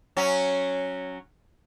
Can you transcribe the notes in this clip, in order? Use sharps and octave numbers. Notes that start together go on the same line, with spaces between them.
F#3 C#4